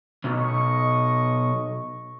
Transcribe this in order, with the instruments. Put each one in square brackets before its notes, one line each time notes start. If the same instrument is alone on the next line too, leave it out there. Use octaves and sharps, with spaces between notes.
[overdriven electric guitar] B1 [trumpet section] D#5 C#6